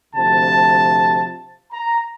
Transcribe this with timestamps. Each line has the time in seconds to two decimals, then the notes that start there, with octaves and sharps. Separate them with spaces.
0.14 D2 C3 F3 A5
1.72 A#5